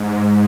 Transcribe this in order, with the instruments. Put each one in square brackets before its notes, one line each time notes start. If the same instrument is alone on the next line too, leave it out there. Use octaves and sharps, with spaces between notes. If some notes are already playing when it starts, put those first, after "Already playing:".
Already playing: [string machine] G#2